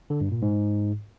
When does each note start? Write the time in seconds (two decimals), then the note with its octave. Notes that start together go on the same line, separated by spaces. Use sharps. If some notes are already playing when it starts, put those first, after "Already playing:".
0.10 D3
0.21 G2
0.31 A#2
0.42 G#2